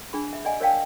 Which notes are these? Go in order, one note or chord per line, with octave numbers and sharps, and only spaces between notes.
D4 G#4 B5
E5
D5 D#5 F#5 G#5
A#4 C#5 D5 F5 G5 A5